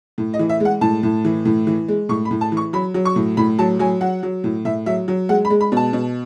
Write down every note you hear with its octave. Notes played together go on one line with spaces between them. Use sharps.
A2
D#5
E3
E5
G#3
F#5
A2 A5
A2
E3
A2
E3
G#3
A2 C#6
B5
A2
A5
E3
C#6
F#3 B5
F#3
C#6
A2
A2 B5
F#3 A5
F#3 G#5
F#3 F#5
F#3
A2
A2 E5
F#3 E5
F#3
G#3 F#5
B5
G#3
B5
B2 A5
B2